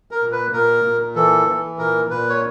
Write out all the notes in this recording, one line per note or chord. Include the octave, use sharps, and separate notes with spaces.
A#4
A#2
B4
A#2 A#4
A#2
E3 A4
E3
A#2 A#4
A#2 B4
C#5